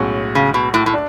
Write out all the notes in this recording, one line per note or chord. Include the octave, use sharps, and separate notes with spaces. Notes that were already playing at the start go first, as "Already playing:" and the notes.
Already playing: B1 A2 G#3 C#4 F#4
C#3
B2
A2
A2
D4